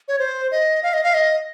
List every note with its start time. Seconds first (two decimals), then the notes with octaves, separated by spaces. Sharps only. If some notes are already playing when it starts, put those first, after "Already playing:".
0.08 C#5
0.19 C5
0.51 D#5
0.83 F5
0.93 D#5
1.04 F5
1.14 D#5